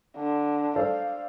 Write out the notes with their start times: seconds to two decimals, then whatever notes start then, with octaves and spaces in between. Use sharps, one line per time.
0.17 D3
0.76 A4 C5 D5 F5